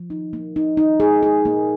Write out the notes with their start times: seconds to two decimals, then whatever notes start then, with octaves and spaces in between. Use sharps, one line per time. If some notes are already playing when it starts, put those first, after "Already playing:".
Already playing: F3
0.10 D#4
0.33 A#3
0.56 D#4
0.77 D#4
1.00 G#4
1.23 G#4
1.45 A#3